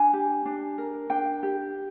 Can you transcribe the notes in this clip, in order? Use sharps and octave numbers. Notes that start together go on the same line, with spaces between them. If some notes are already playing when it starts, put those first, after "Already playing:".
Already playing: D4 G#5
G4
D4
A#4
D4 G5
G4